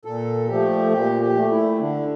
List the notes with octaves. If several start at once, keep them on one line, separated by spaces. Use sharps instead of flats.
A#2 A4
F3 A3 G4
A#2 G4
G4
A3
E4
D3 D4